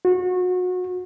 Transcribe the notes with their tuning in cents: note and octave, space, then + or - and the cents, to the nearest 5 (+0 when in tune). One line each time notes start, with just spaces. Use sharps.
F#4 -30